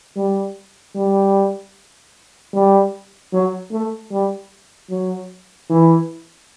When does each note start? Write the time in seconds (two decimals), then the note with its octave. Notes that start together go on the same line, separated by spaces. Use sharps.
0.16 G3
0.95 G3
2.54 G3
3.33 F#3
3.72 A3
4.11 G3
4.90 F#3
5.70 E3